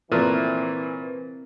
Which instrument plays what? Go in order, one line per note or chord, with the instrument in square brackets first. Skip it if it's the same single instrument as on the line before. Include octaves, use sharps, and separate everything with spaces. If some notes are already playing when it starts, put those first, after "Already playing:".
[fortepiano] A#2 A3 [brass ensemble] E3 [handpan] C4 A#4 [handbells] B4